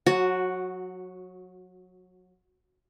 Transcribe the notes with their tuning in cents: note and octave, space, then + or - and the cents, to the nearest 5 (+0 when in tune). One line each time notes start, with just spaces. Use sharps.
F#3 -25 F#4 +0